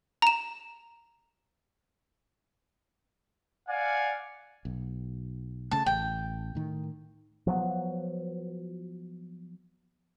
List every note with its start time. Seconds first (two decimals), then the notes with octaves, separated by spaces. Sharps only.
0.22 A#5 E7
3.69 D5 F5 F#5 G#5
4.65 B1
5.71 C#3 A3 A5
5.86 A1 G5
6.55 A2 D#3
7.47 F3 F#3 B3